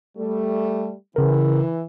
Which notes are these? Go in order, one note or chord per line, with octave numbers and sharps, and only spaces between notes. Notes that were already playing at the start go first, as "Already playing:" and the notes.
G3 A3
C#3 E3 A#4